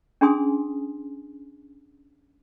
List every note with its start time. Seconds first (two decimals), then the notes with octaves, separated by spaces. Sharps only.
0.21 C#4 D4 G#4 G#5 C6 D#6